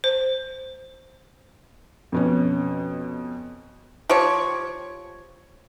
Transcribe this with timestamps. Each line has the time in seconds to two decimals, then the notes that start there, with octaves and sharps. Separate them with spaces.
0.04 C5
2.12 F2 B2 C#4
4.10 F3 G4 C#5